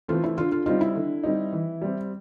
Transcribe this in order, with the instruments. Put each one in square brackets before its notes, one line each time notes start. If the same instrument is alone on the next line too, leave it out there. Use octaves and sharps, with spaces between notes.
[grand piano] E3 A3 C4 [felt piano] F4
[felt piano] E4
[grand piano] D3 [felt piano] F4
[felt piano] F4
[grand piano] G3 C4 D#4 [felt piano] F4
[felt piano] E4
[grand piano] D3
G3 C4 D#4
E3
G3 C4